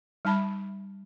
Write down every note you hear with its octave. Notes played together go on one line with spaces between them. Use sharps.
G3 D#4 E5 A5 B5